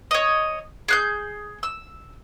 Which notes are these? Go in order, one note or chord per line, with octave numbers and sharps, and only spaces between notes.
C#5 D#5
G#4 F#6 G6
E6